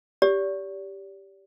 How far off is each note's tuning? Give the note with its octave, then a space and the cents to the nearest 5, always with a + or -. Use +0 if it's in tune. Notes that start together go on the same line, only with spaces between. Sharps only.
G4 +0 D5 -35